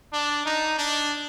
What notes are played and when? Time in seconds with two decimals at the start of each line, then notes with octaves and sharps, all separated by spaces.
0.13 D4
0.46 D#4
0.78 D4